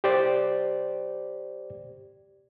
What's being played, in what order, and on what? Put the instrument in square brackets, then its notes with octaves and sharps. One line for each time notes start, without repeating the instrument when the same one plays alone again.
[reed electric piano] G4 C5 D5